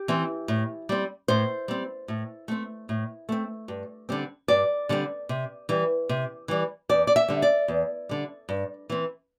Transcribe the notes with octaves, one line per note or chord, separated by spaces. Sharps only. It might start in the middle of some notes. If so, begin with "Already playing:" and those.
Already playing: G4
E3 C4
A2
G3 C4
A2 C5
G3 C4
A2
A3 C4
A2
A3 C4
G2
D3 G3 C4
G2 D5
D3 G3 C4
C3
E3 G3
C3
E3 G3
E2 D5
D5
E5
D3 G3
D5
E2
D3 G3
G2
E3 C4